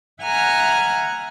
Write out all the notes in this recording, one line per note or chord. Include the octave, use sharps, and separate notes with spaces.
E5 F#5 G#5 A#5 F6 F#6